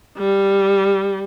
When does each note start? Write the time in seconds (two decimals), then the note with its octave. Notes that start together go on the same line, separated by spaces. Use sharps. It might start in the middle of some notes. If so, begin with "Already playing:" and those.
0.18 G3